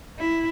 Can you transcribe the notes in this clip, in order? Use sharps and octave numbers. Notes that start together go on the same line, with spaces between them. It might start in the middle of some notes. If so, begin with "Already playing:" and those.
E4